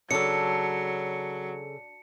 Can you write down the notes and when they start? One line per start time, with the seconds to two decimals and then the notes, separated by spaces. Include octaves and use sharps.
0.11 C#3 F#3 D4 A4 C#7